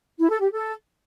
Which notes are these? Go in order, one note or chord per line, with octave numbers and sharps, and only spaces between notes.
E4
A4
G4
A4